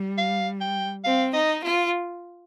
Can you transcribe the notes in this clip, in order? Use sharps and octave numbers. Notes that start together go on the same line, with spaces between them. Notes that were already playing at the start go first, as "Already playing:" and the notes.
Already playing: G3
F5
G5
C4 F5
D#4 D#5
F4